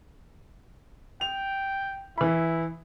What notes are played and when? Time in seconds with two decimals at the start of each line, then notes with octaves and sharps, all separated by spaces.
1.21 G5 F7
2.18 E3 E4 B5